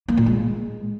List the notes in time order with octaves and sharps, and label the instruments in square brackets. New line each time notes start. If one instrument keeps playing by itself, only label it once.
[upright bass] A#3
A#2
G#3